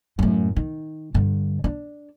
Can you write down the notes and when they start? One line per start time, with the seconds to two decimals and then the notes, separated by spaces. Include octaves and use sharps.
0.19 F#2 A2
0.56 D#3
1.14 G2 D3
1.64 D4